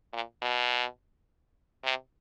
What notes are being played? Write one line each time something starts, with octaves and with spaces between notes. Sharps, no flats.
A#2
B2
C3